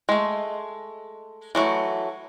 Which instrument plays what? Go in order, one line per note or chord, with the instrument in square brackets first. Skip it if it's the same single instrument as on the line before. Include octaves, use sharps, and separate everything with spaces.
[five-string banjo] G#3 A3
E3 F#3 G#3 A3